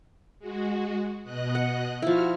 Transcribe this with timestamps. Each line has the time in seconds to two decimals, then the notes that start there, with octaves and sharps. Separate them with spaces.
0.39 G#3 F#4
1.24 B2 D#5 F#6
1.55 F#5
2.02 F3 E4 F#4 F6